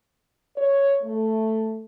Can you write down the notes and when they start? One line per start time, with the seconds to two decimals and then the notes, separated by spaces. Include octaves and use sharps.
0.57 C#5
1.03 A3